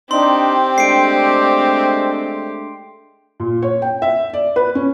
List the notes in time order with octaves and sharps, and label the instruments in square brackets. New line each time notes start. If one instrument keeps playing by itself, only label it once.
[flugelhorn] C4 [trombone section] D4 D#4 [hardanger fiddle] G4 [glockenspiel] C6
[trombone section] G#3 A3 D4 [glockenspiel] C7 D7
[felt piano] A#2
C#5
G5
E5
D5
B4
C#4